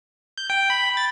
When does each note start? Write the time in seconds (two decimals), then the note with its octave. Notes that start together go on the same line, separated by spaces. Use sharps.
0.38 G6
0.50 G5
0.70 B5
0.97 A6